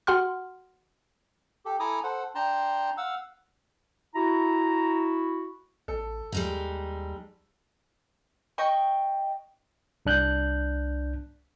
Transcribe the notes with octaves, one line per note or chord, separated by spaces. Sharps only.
F#4 F#5 C6 F6
G4 A4
E4 A4 G#5 A#5 D6 D#6
A4 C5 F#5
D4 G5 A5 A#5 C6
F5 F#5 E6
E4 F#4 A#5
A1 A4
D#2 G3 G#3 D#4
D#5 G5 C#6
C2 D4 F#6 G6